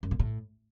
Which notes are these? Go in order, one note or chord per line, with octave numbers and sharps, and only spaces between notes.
F#2
A#2
A2